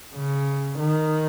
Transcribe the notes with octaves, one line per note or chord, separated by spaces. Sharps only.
C#3
D#3